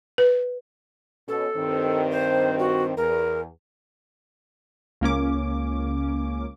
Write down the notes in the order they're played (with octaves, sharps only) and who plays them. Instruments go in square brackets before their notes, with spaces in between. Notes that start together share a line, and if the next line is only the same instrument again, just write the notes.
[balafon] B4
[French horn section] B2 C#4 [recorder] A4
[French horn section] G2 D#3 C4
[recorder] C5
F#4
[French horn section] E2 [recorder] A#4
[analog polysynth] C#2 A#3 C#4 D6